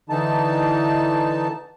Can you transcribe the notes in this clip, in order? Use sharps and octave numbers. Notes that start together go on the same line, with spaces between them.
D3 E3 D#4 A5